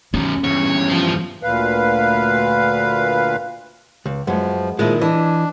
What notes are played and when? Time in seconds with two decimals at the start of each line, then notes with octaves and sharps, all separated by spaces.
0.14 F#2 B2 C#4
0.44 E2 G2 C#5
0.90 F3 F4
1.43 D2 A#2 B4 F5
4.06 C#2
4.27 F#2 F3 G#3 B3
4.79 A#2 D#3 F3 G#3 E4
5.01 E3 D4 D#5